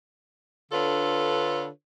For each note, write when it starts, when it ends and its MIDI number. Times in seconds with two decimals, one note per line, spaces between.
0.72 1.67 50
0.72 1.67 62
0.72 1.67 65
0.72 1.67 69
0.72 1.67 71
0.72 1.67 73